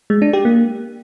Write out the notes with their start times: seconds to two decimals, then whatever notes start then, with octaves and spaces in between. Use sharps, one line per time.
0.10 G#3
0.22 D4
0.33 G4
0.45 A#3